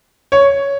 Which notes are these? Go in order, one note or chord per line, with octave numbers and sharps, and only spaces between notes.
C#5